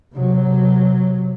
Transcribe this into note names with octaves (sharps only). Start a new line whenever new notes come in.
C3 F#3